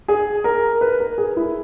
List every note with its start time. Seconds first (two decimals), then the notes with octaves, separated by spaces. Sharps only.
0.08 G#4
0.44 A#4
0.81 B4
1.00 A#4
1.18 G#4
1.37 E4